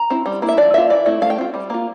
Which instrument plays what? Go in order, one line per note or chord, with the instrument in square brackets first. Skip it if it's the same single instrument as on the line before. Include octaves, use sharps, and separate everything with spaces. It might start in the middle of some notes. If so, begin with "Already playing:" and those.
Already playing: [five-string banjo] A#5
C4 E4
G3
A#3 E4
E5
F3 D5
A#3 F4 E5
E3 D5
A3 C4 E4
A3 F5
G5
C4 F4
G3
A#3 F4